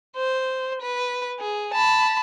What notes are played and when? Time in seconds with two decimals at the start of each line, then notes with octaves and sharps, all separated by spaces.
0.16 C5
0.81 B4
1.39 G#4
1.74 A5 B5